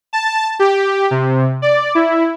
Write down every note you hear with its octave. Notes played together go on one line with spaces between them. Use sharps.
A5
G4
C3
D5
E4